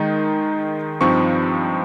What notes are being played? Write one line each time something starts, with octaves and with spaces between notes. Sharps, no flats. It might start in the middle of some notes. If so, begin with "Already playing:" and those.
Already playing: D#3 G#3 D#4
G2 F3 C4 D#4 C#6